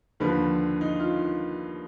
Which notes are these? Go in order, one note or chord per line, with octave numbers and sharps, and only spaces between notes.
D#2 D3 F3 B4
D#4
F4